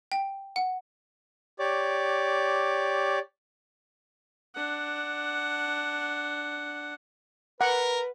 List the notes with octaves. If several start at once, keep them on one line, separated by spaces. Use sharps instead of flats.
G5
F#5
G4 C#5 D5 D6
D4 F#5
A#4 B4 F#5